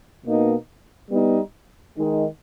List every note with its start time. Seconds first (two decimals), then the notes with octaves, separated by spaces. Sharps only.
0.24 B2 A#3 D#4
1.10 G3 B3 D#4
1.95 D#3 G#3 D#4